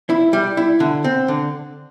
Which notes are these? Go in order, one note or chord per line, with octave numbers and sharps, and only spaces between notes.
E4
G3
E4
D3
C4
D3